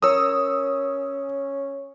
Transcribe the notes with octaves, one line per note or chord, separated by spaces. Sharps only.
C#4 A#4 C#5 D#6 E6